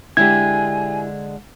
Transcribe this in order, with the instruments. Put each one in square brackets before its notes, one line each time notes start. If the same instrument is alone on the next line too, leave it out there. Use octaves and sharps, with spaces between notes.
[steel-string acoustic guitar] D3 G#3 D4 [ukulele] E4 G4 [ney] G#5 [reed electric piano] G#6